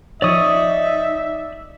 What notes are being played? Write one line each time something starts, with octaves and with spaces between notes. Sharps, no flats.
F3 D#4 C#5 D5 E5 D#6